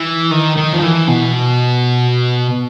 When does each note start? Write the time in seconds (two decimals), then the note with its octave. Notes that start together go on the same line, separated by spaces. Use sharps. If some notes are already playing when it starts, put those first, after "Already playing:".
Already playing: E3
0.31 D#3
0.57 D#3
0.73 F3
0.83 E3
1.08 B2